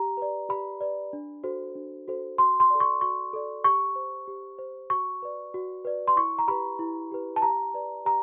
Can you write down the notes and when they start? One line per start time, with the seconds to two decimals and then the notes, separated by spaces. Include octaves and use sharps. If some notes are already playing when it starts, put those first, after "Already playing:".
Already playing: G4 A#5
0.17 B4 D5
0.49 G4 B5
0.81 B4 D5
1.13 D4
1.44 F#4 A4 C5
1.75 D4
2.08 F#4 A4 C5
2.38 F#4 C6
2.60 C6
2.70 A4 D5
2.80 C#6
3.01 F#4 C#6
3.33 A4 D5
3.65 G4 C#6
3.96 C5
4.28 G4
4.58 C5
4.90 F#4 C#6
5.22 B4 D5
5.54 F#4
5.85 B4 D5
6.08 C6
6.16 E4 C#6
6.39 A#5
6.48 G4 B4 B5
6.79 E4
7.11 G4 B4
7.36 A5
7.42 G4 A#5
7.74 B4 D5
8.05 G4 A#5